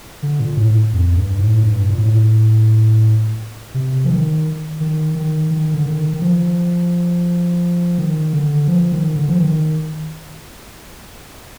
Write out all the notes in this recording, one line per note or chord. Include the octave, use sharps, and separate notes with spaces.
D3
A#2
A2
F2
G2
A2
G2
A#2
A2
C3
F3
D#3
D#3
D#3
D#3
D3
D#3
D#3
F3
D#3
D3
F3
D#3
D3
F3
D#3